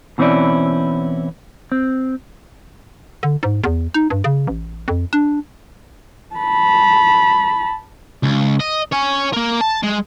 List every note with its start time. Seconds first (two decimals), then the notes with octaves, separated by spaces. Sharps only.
0.18 B2 E3 C4 C#4 E4 D5
1.72 C4
3.23 D3
3.43 G#2
3.64 E2
3.94 D#4
4.10 G2
4.24 C#3
4.47 A1
4.88 F2
5.13 D4
6.36 A5 B5
8.23 C#2
8.60 D#5
8.92 C#5 G#5
9.33 A#3 A#4
9.61 A5
9.83 G#3